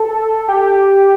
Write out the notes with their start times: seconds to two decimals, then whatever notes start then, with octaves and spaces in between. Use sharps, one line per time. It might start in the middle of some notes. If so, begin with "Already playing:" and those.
Already playing: A4
0.48 G4